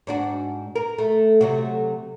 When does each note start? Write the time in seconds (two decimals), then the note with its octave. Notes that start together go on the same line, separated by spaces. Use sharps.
0.07 G#2 D4 F#4
0.75 A#4
0.98 A3
1.41 C3 F#3 A3